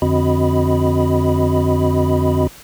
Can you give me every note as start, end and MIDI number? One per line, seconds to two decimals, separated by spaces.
0.02 2.47 41
0.02 2.47 50
0.02 2.47 60
0.02 2.47 66
0.02 2.47 75
0.02 2.47 83